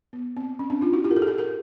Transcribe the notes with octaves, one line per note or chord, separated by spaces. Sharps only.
B3
C4
C#4
C4 D4
D#4 F4
E4 F#4
F4 G4
A#4
G4 A4
G#4
G4 A4
G#4 A#4